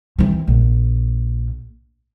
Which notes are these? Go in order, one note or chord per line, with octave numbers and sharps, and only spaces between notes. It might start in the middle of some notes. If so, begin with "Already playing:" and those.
E3 C4
A#1